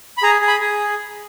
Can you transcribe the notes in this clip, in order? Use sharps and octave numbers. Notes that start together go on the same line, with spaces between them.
B5
G#4 A#5
G#4
B5
G#4